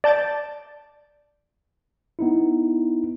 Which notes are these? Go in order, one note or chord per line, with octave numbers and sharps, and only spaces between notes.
D5 A5 G6 A6 D7
B3 D#4 E4